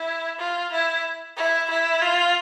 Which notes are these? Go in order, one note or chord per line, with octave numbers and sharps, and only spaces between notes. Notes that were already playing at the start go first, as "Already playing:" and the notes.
Already playing: E4
F4
E4
E4
E4
F4